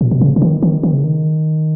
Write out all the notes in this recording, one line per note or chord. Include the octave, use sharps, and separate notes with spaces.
A#2
B2
C#3
C#3
D#3
D#3
D#3
C#3
D#3